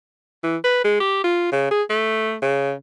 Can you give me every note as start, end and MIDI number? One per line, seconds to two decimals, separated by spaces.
0.44 0.57 52
0.64 0.80 71
0.85 0.99 56
1.01 1.20 67
1.24 1.52 65
1.52 1.69 49
1.71 1.83 68
1.90 2.36 57
2.43 2.73 49